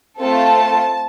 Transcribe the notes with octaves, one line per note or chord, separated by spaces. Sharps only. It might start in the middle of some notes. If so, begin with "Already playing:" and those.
A3 C4 F4 A4 A5